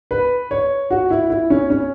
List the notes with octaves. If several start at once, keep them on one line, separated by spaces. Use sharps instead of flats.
B4
C#5
F#4
E4
E4
C#4
C#4